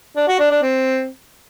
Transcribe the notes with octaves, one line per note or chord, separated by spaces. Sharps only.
D4
F#4
D4
D4
C4